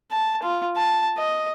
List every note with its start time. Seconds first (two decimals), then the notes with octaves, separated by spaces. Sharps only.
0.11 A5
0.43 F4
0.76 A5
1.17 D#5